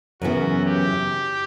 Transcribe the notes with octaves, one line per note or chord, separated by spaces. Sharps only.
F#2 C#3 E3 B3 F#4
G4